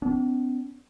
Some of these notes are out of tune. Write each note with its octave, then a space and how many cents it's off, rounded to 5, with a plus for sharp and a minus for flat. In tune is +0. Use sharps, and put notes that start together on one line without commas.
B3 +40 D4 -45